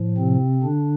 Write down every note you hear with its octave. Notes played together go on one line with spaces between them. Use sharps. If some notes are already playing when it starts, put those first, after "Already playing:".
Already playing: A2 F3
C3 C4
D3 D4